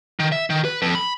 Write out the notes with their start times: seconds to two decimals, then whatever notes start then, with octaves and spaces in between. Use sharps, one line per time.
0.20 D#3
0.32 E5
0.50 D#3
0.65 B4
0.82 F2
0.95 B5